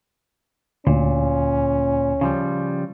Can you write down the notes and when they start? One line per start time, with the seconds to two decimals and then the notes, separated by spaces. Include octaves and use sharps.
0.87 D2 A#2 C#4
2.21 C#3 F3 G3